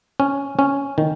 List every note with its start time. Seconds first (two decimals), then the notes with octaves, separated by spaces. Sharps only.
0.20 C#4
0.59 C#4
0.98 D#3